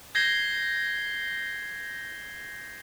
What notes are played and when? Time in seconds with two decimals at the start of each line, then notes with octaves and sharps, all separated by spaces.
0.15 G6 G#6 A#6 C7 G7